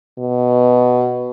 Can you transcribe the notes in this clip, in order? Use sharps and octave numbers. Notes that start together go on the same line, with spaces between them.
B2